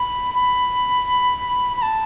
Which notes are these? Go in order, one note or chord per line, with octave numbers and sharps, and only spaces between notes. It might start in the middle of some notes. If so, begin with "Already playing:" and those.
Already playing: B5
B5
B5
A5